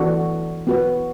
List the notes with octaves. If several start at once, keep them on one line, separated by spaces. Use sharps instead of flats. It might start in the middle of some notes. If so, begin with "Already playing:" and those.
Already playing: E3 B3 D4 F#4 A4
B3 F#4 B4